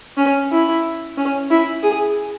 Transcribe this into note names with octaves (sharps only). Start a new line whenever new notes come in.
C#4
E4
C#4
E4
G#4